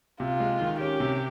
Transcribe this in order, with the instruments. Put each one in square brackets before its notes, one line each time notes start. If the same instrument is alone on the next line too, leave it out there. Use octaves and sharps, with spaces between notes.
[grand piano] C3 [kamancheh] F4
[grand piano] G#3
D#3
[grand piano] C#4 [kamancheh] G4
[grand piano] C3